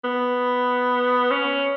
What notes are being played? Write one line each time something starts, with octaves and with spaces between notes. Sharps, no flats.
B3
C#4